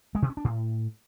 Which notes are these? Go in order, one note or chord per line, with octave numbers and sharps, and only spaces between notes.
G#3
B2
C#4
D4
A2